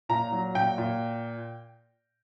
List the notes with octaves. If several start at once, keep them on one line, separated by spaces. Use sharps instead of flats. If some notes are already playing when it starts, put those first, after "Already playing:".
A#2 A#5
F#3
A#2 G5
A#2